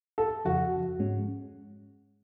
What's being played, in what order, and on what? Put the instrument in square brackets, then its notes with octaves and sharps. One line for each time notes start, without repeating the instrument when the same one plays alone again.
[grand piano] A4
[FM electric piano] F2 C#3 F3 [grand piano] F#4
[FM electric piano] G#2 G#3 C#4